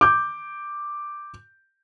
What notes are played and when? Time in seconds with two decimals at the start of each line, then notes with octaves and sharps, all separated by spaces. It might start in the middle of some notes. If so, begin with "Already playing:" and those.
0.01 D6 G6